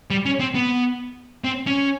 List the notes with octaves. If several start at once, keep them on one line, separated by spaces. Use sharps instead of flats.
G3
C#4
C4
B3
C4
C#4